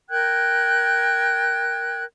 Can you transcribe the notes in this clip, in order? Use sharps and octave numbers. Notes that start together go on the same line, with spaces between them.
A#4 G5 F#6 G#6